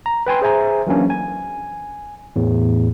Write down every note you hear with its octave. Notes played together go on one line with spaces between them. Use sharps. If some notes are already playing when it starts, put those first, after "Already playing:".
A#5
B4 G5 G#5 C6
G#4 C5 E5 G#5 A#5
E3 F#3 A#3 C#4 D4
G#5
E2 A2